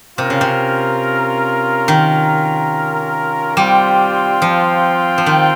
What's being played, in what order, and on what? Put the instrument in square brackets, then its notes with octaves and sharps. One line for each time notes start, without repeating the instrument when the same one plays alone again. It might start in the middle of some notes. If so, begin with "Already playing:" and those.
[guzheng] C3 [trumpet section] C#4 F4 A#4
[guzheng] C#3
C3
D#3
[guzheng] G3 [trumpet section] C4 F4 C5 G5
[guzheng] F3
F3
D#3